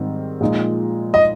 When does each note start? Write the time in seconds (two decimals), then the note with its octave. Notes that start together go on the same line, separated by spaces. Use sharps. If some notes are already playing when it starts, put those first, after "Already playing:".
Already playing: G#2 D#3 G3 C4 D#4
0.41 A#2 F3 G#3 D#4
1.14 D#5